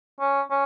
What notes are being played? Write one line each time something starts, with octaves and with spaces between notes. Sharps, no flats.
C#4
C#4